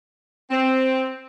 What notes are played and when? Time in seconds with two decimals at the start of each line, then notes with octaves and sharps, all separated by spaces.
0.51 C4